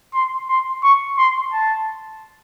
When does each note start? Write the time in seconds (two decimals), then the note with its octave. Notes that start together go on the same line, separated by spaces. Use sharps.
0.14 C6
0.49 C6
0.83 C#6
1.18 C6
1.52 A5